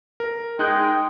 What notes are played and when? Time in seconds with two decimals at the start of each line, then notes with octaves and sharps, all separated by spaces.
0.20 A#4
0.59 G#3 D#4 G#4 G5 F#6 G6